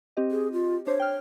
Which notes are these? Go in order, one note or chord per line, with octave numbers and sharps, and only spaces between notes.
C4 G4 D#5
G#4
F4
D4 C5 C#5
G5 F6